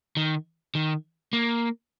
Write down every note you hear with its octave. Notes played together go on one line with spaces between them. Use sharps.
D#3
D#3
A#3